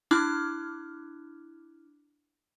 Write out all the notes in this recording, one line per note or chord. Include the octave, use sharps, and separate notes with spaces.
D4 E4 D6 F6